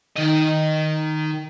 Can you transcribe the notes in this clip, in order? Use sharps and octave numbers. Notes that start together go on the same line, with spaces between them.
D#3 D#5